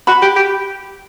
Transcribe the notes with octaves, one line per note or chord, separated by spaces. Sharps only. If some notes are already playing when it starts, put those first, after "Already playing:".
F#4 B5
G4
G4